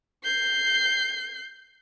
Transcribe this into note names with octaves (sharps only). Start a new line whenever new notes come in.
G6 C7